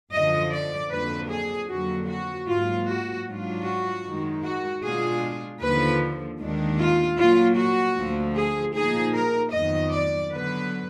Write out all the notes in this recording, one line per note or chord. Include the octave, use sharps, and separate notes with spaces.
F#2 D3 F3 D#5
D5
F2 D3 F#3 A#3 D4 B4
G#4
F2 D3 F#3 A#3 F#4
F#4
G#2 F#3 A#3 F4
F#4
G#2 F#3 D4 F4
F#4
F#2 D#3 G#3
F#4
B2 G#3 D4 F4 G#4
D#2 D3 F3 B4
D#2 D#3 G#3 D4
F4
A#2 F#3 A#3 F4
F#4
D2 D3 F3
G#4
A#2 F3 A#3 D#4 G#4
A#4
F2 D#3 F#3 B3 D#5
D5
D3 F#3 B3 B4